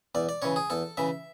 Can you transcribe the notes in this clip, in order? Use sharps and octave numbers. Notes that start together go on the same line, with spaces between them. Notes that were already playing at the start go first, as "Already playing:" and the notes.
E2 D5
D5
C#3 E3 C#5
G#4
E2 A4
C#3 E3 E5